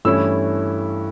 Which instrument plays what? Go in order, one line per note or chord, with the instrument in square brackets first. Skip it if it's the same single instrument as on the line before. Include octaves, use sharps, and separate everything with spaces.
[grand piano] G2 E3 A3 C#4 E4 E6